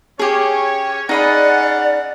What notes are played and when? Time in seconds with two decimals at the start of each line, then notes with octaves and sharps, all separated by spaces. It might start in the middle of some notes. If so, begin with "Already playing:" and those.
0.19 C#4 G4 G#4 C#5
1.09 C#4 D#4 G#4 D5 F5 F#5 B5